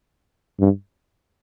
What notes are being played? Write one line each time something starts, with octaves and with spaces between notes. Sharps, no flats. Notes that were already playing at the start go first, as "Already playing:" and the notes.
G2